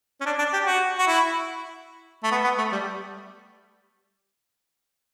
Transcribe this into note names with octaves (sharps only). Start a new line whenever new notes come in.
C#4
D4
D4
G4
F#4
F#4
E4
A3
B3
B3
A3
G3